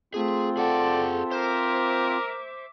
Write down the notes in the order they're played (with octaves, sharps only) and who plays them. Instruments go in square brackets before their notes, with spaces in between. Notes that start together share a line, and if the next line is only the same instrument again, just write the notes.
[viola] A3 [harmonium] C4 F4 [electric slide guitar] G#4
[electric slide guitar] G#4 F#5 G5 [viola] A4 [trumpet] D5
[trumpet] A#4 [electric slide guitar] C5 [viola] E5 D6